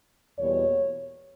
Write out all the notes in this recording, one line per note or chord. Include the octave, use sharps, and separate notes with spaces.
E2 B2 G3 A#3 C#5